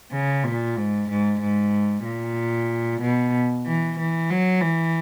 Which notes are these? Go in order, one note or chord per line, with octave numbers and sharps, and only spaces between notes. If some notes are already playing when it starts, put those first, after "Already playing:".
C#3
A#2
G#2
G#2
G#2
A#2
B2
E3
E3
F#3
E3